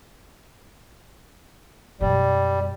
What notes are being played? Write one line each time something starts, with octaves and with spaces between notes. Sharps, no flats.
F#2 B2 G3